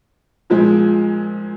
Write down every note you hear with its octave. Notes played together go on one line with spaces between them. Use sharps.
A#2 F3 G#3